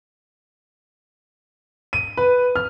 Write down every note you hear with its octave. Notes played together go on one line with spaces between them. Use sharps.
D#7
B4
F6